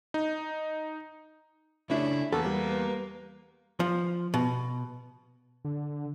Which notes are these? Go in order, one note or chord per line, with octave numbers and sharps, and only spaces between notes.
D#4
C#3 A3 D4 E4 G4 C#5
E2 A#3 A4 B4
G3 B3
F3
B2
D3